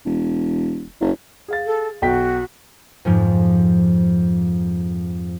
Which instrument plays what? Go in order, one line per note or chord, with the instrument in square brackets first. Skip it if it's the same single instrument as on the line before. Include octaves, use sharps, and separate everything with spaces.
[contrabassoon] E1
F#1
[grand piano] G#4 F5 A6
[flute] A4
[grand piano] B1 G5 B6 [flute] F#4
[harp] F2 G#2 F3